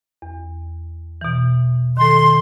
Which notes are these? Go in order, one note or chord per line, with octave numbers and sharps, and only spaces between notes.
E2
B2 E3
D#3 A4 C6